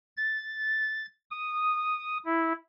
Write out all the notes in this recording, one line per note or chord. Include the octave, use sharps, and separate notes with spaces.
A6
D#6
E4